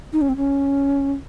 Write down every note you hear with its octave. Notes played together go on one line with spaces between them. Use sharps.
D#4
C#4
C4
C#4